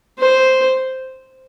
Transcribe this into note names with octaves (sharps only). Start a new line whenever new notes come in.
C5